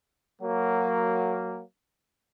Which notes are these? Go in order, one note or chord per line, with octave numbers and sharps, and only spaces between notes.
F#3 A#3